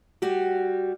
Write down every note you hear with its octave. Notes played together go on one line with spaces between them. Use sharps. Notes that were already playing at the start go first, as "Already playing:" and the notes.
G3 F#4 G4